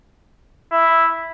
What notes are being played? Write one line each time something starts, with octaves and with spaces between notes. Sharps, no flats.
E4